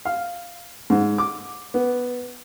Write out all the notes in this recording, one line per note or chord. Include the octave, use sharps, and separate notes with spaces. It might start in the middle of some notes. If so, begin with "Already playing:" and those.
F5
G#2
D6
B3